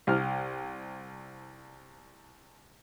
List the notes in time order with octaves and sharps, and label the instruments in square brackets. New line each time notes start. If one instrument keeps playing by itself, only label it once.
[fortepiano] C2 F6